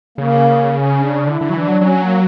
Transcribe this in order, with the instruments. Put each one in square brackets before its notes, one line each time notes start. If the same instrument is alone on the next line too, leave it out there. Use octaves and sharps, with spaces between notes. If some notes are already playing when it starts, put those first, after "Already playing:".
[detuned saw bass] C#3 [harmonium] A#3
[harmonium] C#4
D4
[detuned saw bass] D3 [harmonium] E4
[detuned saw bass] D3
F#3
[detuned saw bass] E3 [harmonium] D4
[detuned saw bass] F#3
[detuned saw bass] F#3 [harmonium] C#4
[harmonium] A#3